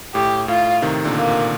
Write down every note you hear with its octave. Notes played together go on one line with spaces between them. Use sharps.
A2 G4
A2 F4
C3 D#3
A#2 D3
A#3
A#2